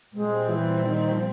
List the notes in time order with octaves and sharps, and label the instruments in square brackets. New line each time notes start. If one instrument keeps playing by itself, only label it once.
[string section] A#2 G3 C4 [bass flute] G#3
[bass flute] E3
D#3
F3